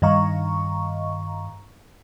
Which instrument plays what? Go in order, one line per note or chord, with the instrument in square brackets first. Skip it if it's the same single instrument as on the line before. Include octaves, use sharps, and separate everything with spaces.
[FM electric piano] G2 D#3 D#5 F5 A#5 C#6